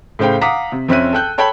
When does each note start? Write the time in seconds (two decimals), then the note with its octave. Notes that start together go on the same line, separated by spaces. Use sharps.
0.19 A2 C#3 C5 F5 G5
0.41 F5 F#5 A#5 D6 D#6 B6
0.72 C3
0.88 F2 C4 C#4 E5 F#6 D#7
1.13 A4 G5 F#6 G6
1.38 A4 C#5 G5 A5 B5